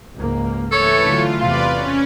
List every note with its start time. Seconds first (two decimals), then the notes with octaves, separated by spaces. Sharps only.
0.16 C#2 G#2 A#3
0.72 E3 A3 A4 C#5
1.05 D3 F#3 F4
1.40 E2 C3 F4 B4 D5
1.71 C#4